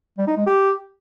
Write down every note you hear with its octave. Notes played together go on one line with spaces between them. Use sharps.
G3
D#4
G#3
G4